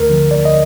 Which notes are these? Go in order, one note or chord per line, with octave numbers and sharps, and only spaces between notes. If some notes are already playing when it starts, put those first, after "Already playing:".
Already playing: D2 A#4
D3 F3
D2 D5
D#5